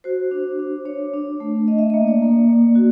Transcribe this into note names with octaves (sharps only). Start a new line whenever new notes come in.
F#4 C5
D4
D4
D4 C#5
D4
A3
D4 D#5
E5
A#3 D#5
D5
A#3
A#3
F#4